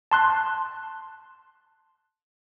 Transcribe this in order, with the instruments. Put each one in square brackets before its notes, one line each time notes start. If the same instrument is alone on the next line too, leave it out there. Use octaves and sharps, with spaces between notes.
[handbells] A5 C6 F#6